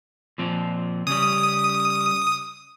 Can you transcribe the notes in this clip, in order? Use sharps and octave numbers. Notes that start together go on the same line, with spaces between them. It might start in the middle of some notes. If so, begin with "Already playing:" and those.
A#2 F3 C4
C#3 G3 D#6